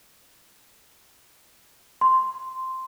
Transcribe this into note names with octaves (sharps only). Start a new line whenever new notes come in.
C6